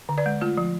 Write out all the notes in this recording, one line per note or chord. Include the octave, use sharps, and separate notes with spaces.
D3
B4 D5
G#3
A3 F4
F3